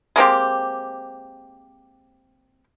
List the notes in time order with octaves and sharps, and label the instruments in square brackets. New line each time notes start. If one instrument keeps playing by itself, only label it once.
[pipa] G#3 A#3 C4 G4